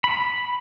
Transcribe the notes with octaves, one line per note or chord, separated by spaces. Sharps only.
B5